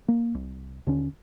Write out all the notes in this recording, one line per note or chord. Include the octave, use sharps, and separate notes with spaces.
A#3
C2
D#2 D3 C#4